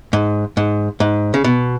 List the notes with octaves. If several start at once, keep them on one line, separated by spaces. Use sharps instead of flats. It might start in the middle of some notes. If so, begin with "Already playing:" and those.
G#2
G#2
G#2
C#3
B2